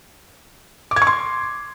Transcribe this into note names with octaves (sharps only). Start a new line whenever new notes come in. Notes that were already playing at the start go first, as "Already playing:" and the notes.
D6
G#6
C#6
C6